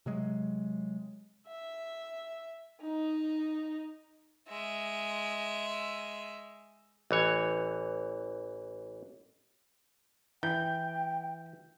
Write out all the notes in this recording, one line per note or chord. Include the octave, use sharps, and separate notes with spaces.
C3 F#3 G#3
E5
D#4
G#3 E5
A1 E3 C#5
E3 G5 G6